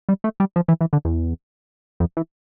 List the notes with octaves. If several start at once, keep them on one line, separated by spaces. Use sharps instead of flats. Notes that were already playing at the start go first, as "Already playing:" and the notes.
G3
A3
G3
F3
E3
E3
D3
E2
F2
E3